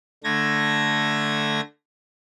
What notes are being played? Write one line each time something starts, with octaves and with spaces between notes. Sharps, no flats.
D3 A3 G#6 A#6